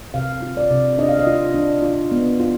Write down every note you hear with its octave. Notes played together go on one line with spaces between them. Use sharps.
C3 F5
F4
D5
C3
D4 D#5
F5
D#5
F4
D4
F4
B3
F4